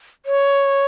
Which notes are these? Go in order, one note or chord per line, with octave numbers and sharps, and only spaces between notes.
C#5